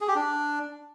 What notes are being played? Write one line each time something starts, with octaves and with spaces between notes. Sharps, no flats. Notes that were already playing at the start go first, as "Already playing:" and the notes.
G#4
G4
D4